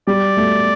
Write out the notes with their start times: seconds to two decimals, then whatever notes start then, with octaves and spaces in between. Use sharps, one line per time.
0.07 G3 D5
0.37 A3